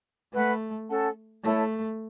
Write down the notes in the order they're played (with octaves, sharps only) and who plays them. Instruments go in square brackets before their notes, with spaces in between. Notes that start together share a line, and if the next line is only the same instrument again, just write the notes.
[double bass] A3 [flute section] B4 F#5 B5
[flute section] C#4 A4 F#5 A5
[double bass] A3 [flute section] E4 A4 C#5 A5